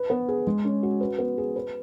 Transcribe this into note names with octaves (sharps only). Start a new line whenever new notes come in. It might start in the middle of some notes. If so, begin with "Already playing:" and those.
Already playing: B4
B3
G#4
G#3
C#4
F#4
B4
B3
G#4
B4